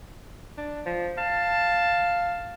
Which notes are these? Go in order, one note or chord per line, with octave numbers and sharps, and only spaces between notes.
D4
F3
F5 A5